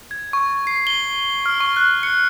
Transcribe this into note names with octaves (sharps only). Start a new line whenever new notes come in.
G#6
C#6
C7
G7
F6
C#6
F#6
C#7